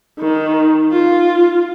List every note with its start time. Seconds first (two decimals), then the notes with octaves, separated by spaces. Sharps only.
0.20 D#3
0.92 F4